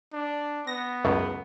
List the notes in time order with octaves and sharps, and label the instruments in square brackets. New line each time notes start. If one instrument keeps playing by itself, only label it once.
[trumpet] D4
[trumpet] B3 [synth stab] A#6
[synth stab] C#2 F#2 A2